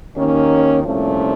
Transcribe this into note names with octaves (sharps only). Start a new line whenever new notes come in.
D#2 D#3 A#3 C#4
C2 A#2 F3 A3 C#4